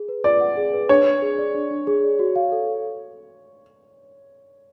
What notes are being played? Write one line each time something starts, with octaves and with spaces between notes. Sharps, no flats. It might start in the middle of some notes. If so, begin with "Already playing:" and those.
Already playing: G#4
B4
F4 D5
F#5
G#4
B4
D4 C#5
D4
G#4
D5
D4
D4
G#4
D5
F#4
F5
A4